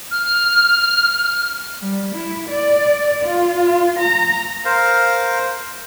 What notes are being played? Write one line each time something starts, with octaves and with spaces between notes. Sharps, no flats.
F6
G3
E4
D5
F4
A#5
A#4 C5 F5